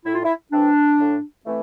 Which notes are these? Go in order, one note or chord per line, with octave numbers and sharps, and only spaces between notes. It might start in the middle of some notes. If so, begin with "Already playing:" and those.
A2 E4
F4
E4
E3 A3 C4 D4
A2
E3 A3 C4